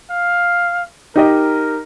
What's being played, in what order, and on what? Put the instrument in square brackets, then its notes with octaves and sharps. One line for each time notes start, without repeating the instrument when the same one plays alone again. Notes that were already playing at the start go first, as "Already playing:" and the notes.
[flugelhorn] F5
[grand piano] D#4 G4 D#5 [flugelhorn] A#4